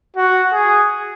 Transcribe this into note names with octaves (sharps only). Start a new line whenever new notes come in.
F#4
G#4